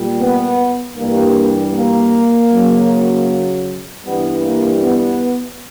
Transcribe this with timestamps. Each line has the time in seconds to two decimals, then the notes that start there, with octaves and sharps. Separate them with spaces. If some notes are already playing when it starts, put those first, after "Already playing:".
Already playing: A#2 G3
0.20 B3
0.97 G2 E3 G3 A#3
1.74 A#3
2.51 F#2 C#3 F#3
4.05 G2 E3 G3 B3
4.43 A#3
4.82 B3